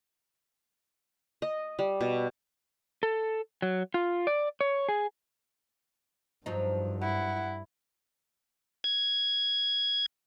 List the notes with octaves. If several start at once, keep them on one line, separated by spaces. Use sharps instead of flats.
D#5
G3
B2
A4
F#3
F4
D5
C#5
G#4
G2 F3 F#3 D#4
F#2 E4 F#5
G#6